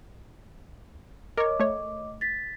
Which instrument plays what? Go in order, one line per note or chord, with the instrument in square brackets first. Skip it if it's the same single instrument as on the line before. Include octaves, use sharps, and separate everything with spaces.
[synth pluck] A#4 C#5 [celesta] D#5 D6
[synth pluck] A3 C#5
[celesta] A6 B6